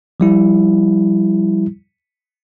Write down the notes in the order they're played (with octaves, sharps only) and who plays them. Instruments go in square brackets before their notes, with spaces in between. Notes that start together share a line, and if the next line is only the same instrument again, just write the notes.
[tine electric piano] F3 G3 E4